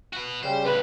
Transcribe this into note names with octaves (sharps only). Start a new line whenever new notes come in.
F#4 B4
C#3 G3 C5
A2 C#3 B4